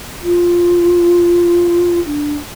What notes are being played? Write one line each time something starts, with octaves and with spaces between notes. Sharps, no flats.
F4
D4